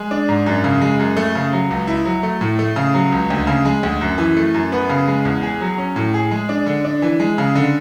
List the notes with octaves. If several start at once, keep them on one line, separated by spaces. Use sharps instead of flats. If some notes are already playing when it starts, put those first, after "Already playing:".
Already playing: G#3
D4
G#2
F#2
C#3
G#3
F#2
A3
C#3
F#3
C#2
E4
F#3
A3
A2
A3
C#3
F#3
C#2
D2
C#3
G#3
D2
F#2
E3
A3
F#2
B3
C#3
G#3
E2
G#4
F#3
C#4
A2
G#4
G#3
D4
D3
D4
E3
G#3
C#3
D3